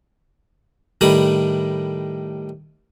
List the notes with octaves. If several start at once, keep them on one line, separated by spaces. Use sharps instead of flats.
A2 D#3 G3 B5 D#6